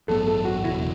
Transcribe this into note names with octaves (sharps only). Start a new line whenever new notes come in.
A1 G2 F#3 B3 A4
A4
F#4
F#1 E2 B2 E4